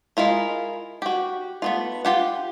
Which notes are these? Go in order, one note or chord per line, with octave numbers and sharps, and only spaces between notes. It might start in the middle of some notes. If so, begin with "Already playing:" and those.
G#3 E4 F4 A#4
F#4 G4
A3 B3 F4
F4 G4 F#5